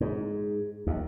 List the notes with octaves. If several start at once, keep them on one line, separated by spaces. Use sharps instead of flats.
G#2
D#2